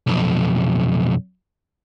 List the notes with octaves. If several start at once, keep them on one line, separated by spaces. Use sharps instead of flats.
B1 F2